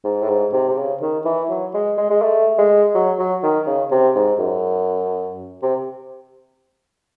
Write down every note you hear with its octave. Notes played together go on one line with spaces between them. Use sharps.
G#2
A2
G#2
C3
C3
C#3
D#3
E3
F#3
G#3
G#3
G#3
A3
G#3
F#3
F#3
D#3
C#3
C3
G#2
F#2
C3